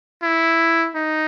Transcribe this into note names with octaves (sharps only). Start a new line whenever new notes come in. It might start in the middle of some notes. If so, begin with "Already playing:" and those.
E4
D#4